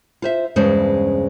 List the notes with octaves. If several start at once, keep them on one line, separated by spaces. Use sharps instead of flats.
F4 C5 E5
E2 G2 C#3 G#3 C#4 C5